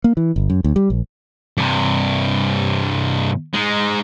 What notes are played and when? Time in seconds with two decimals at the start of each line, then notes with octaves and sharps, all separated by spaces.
0.04 A#3
0.17 E3
0.36 G1
0.50 F#2
0.64 D2
0.76 G3
0.90 A#1
1.57 G2 C3
3.54 G#3 D#4